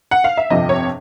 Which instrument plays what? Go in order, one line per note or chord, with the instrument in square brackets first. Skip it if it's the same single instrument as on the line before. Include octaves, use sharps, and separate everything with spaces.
[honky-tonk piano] F#5
F5
E5
G1 F2 C3 F3 D#5
C#5